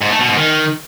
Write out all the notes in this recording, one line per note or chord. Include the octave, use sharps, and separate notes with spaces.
G#2
A3
B2
G#2
D#3